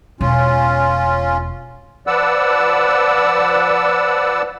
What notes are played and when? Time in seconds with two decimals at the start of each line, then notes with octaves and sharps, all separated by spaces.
0.21 E1 C#4 F4
2.07 F3 B4 D5 F#5 E6